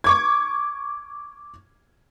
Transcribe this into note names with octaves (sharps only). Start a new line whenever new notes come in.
C#6 D6 G#6